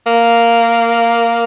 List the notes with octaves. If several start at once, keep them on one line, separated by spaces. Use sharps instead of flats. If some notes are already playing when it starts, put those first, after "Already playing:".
A#3